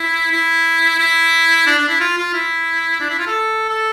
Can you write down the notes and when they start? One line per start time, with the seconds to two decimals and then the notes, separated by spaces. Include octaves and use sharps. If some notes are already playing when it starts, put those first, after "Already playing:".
Already playing: E4
0.32 E4
0.99 E4
1.66 D4
1.78 D4
1.89 E4
2.00 F4
2.18 F4
2.34 E4
3.01 D4
3.10 E4
3.19 F4
3.27 A4
3.69 A4